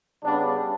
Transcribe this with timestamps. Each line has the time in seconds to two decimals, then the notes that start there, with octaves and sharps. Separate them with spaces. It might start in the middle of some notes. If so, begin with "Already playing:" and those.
0.23 C#3 G3 B3 D4